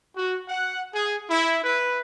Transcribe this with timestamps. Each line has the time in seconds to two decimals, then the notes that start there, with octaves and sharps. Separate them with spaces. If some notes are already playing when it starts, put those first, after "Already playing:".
0.16 F#4
0.48 F#5
0.93 G#4
1.30 E4
1.63 B4